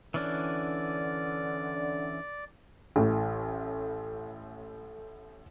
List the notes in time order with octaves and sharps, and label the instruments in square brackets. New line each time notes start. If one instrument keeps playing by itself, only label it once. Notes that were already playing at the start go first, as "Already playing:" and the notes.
[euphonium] D3 [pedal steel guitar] E3 C#4 D4 [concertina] D5
[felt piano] A1 A2